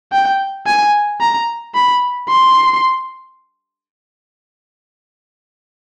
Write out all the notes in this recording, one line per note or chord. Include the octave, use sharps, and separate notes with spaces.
G5
G#5
A#5
B5
C6